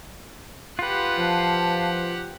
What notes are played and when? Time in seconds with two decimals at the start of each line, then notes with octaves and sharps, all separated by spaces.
0.79 F4 G4 B4 F#5
1.18 F3 F5 A5